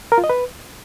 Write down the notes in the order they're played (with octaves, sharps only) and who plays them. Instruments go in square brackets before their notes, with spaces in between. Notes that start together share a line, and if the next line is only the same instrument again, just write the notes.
[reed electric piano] A#4
F4
D#5
B4